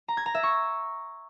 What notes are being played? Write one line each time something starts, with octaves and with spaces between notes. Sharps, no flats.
A#5
G#6
A#5
E5
C#6